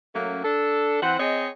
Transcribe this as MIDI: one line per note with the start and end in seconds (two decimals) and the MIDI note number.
0.14 0.41 54
0.14 0.41 57
0.14 0.41 58
0.14 0.41 61
0.44 0.98 62
0.44 0.98 69
1.01 1.18 52
1.01 1.18 60
1.01 1.18 72
1.01 1.18 78
1.20 1.49 60
1.20 1.49 68
1.20 1.49 73
1.20 1.49 75